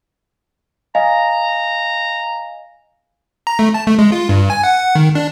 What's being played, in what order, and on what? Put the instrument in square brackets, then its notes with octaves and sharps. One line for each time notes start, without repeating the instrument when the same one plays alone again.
[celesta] D#5 F5 G#5 [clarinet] A#5
[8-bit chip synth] A#5
A3
A5
A3
G#3
F4
G2
G#5
F#5
D#3
D4